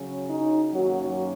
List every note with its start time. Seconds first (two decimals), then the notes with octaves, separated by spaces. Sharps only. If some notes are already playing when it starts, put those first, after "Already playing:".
Already playing: C#3 F#3 C#4
0.28 D#4
0.73 F#2 D#3 F#3 A#3 C#4 F#4